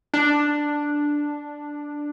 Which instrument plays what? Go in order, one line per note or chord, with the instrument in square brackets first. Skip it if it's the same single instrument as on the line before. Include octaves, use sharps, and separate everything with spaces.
[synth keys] D4